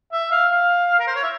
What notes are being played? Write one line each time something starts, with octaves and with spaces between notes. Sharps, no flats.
E5
F5
F5
A#4
C5
C#5
E5